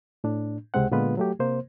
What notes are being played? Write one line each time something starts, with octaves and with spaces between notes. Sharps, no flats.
A2 D4
C#2 C3 G#3 C4 F#5
A#2 D3 G#3 B3 F4 B4
F#3 A3 G4
C3 A#3 C5